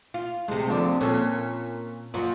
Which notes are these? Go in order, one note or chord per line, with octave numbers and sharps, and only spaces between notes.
F4
D2 C3 G#3
A#1 D3 D5
A#2 C#4 A4 C#5
F#2 A#2